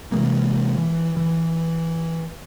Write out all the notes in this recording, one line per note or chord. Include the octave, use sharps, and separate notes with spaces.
C3 E3 G#3 A#3
E3
E3